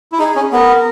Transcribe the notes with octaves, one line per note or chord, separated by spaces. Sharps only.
E4
D#4 G#4
C#4
B3 A#4